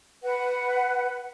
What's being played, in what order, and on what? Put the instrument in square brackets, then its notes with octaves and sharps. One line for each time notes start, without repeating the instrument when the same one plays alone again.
[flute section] B4 F#5